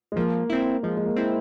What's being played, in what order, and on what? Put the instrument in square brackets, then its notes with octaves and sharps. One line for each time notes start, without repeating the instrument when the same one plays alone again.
[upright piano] G#3
[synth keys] F3 [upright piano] A#3
[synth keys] C4 E4
[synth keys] F3 [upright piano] G#3
[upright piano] G#3
A#3
[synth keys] C4 E4